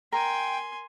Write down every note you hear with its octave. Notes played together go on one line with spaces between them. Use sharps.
A#4 G5 G#5 C6